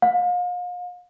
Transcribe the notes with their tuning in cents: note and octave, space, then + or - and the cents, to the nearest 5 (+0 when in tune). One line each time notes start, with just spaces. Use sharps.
F5 +40